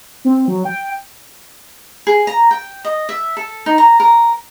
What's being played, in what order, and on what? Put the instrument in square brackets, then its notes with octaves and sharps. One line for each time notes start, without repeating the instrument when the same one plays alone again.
[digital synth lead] C4
F#3
G5
[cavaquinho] G#4
A#5
G5
D#5
E5
A4
D#4
A#5
A#4